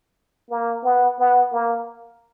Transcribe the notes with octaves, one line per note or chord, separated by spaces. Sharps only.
A#3
B3
B3
A#3